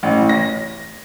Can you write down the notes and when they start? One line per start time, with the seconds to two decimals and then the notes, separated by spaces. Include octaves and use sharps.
0.03 A1
0.29 A#6